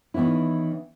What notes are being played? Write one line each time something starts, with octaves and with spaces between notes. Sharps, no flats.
D#3 E3 B3 C#4 E4